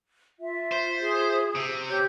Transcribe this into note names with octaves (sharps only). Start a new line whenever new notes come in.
F4 E5
C5
G#4
C3
G4 C#5 G6